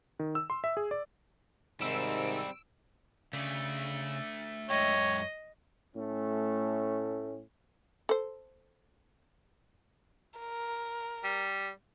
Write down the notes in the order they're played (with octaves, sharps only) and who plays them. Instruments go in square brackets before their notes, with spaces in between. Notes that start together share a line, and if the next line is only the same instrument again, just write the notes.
[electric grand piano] D#3
E6
C6
E5
G#4
D5
[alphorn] G#2 [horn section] C3 D#3 [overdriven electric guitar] G3 C4 [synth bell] E6 D7 E7
[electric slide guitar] C#3 [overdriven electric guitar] A3 D4
[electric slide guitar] F#2 G#3 G5 [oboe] C#5 [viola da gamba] D#5
[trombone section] A2 A3 C#4
[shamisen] A4 C5
[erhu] A#4
[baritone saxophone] G3